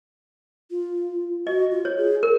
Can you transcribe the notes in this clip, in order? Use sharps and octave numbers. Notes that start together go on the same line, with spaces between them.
F4
F#4 D#5
F4
C#5
G#4
A#4